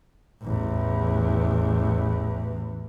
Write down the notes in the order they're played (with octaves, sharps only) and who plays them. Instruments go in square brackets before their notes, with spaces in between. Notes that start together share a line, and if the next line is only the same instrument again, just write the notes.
[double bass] A1 E2